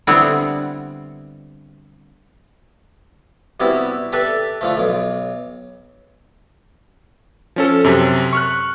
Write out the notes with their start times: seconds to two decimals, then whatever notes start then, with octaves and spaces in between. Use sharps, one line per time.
0.07 D3 G3 B3 C4 E4
3.60 C3 G3 B3 E4 F#4 G4
4.13 G4 A4 B4 D5 E5
4.61 D3 F3 A3
4.77 B1 D6
7.56 F3 C#4 A4
7.84 F#2 C3
8.33 C#6 F6 F#6